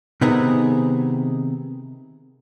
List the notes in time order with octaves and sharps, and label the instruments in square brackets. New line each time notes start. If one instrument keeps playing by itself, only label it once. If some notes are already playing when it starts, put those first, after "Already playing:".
[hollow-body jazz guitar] C3 D#3 B3 C4 D#4 G#4